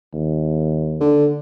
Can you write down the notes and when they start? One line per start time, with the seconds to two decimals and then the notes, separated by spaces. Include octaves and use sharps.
0.13 D#2
1.00 D3